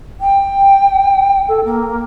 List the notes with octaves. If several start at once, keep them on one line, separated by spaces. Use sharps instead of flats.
G5
A4
A#3